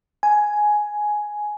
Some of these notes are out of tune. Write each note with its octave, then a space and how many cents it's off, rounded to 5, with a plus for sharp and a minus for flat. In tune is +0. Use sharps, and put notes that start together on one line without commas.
G#5 +10